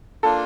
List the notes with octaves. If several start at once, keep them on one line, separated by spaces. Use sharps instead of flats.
A#3 D4 F4 A4